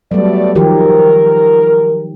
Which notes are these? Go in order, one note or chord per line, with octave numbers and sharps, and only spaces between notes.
F#3 G3 A3 B3 D5
D#3 F3 G4 A#4